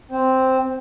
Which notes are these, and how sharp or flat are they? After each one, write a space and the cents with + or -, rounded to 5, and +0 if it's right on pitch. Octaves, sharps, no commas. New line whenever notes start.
C4 +0 C5 +0